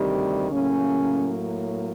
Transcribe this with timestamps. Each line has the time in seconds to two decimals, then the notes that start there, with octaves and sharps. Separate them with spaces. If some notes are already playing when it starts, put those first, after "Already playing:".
Already playing: D2 C3 D#3 G3
0.51 A2 C#3 F#3 A#3 C#4